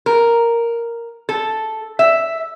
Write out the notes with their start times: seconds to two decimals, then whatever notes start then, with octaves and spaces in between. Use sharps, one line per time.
0.06 A#4
1.29 A4
1.99 E5